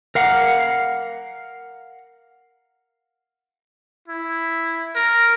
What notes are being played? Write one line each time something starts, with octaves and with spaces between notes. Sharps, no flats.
A#4 F5 F#5
E4
A#4